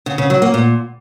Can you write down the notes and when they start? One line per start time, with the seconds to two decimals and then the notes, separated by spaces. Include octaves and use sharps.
0.06 C#3
0.18 C#3
0.30 F#3
0.42 A#3
0.54 A#2